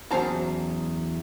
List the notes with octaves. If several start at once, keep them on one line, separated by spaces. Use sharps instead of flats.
E2 F#3 C#4 C5 A5 A#5